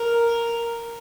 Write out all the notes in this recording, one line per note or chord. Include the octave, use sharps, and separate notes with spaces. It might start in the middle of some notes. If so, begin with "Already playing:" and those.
Already playing: A#4